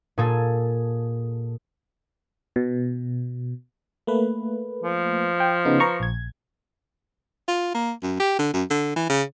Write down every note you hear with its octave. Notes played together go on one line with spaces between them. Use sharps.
A#2 G#4 A4
B2
A3 A#3 B4
F3
G5
C#3 B3 D#4
B4 A#5 C#6
A#1 G#6
F4
A#3
F#2
G4
D3
F#2
D3
E3
C#3